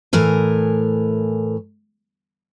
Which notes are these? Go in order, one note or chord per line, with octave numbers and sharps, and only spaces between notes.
A2 E3 A#4 G#5